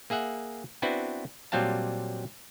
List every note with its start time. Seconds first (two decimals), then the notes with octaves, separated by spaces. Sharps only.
0.10 A#3 G#4 E5 F#5
0.82 B3 C4 D4 E4 F#4 B4
1.52 A#2 F#3 G3 C4 F5 A5